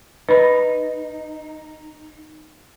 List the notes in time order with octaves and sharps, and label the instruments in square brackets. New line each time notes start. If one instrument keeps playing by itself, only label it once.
[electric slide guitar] D#4 [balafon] B4 B5